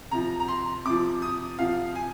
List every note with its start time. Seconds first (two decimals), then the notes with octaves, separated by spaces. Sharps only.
0.11 C3 F3 A#5
0.40 A#5
0.48 C6
0.85 C3 F3 D6
1.22 D#6
1.59 C3 F3 F5
1.95 G#5